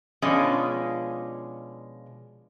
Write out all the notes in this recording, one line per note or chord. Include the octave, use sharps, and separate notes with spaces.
B2 F3 G#3 C#4 D4 F4